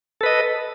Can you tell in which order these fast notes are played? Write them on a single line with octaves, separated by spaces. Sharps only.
A4 B4 D#5